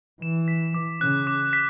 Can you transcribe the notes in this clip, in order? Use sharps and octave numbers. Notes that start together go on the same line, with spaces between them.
E3 E7
B6
D6
C#3 F#6
D6
B6